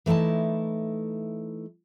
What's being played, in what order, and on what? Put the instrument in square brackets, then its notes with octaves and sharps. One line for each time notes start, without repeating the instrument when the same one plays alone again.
[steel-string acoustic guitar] E3 A3 D#4 E4 A5